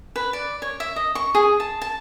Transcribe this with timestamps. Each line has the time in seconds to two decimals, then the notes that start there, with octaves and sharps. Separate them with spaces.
0.16 B4
0.33 D5
0.62 C#5
0.80 E5
0.96 D#5
1.15 C#6
1.35 G#4
1.60 A5
1.82 A5